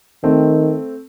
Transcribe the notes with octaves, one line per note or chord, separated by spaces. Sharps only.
D#3 A3 C4